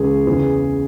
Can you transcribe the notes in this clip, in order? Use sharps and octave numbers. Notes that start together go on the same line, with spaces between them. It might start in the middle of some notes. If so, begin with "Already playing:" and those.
Already playing: C#2 C#3 E3 G#4
E2 C#3 E3